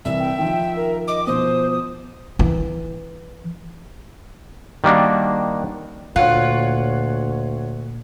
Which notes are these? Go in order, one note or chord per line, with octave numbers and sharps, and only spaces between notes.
C2 E3 E5
G5
D#3 F3 G5
A#4
D#5 D6
B2 F3 C5 D#6
E3
D#3 G3 A#3 D4 F#4
D2 A#2 F4 C#5 F#5 F#6